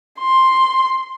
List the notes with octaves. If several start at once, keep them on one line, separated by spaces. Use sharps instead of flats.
C6